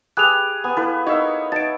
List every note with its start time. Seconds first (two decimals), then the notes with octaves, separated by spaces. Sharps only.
0.17 G4 G#4 B4 F#6 F7
0.64 B3 G#5
0.77 E4 A4 B4 F5
1.07 D#4 A#4 C#5 E5
1.52 D#4 A5 A6 D7